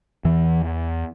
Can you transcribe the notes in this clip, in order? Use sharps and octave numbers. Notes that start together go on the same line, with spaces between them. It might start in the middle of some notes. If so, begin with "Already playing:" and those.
E2 E3